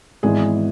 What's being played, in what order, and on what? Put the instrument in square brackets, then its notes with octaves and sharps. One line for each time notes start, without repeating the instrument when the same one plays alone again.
[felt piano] G#1 G#2 E3 G#3 B3 G#4